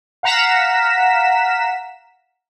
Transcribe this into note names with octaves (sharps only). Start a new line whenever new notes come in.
F5 F#5 A#5 B6 E7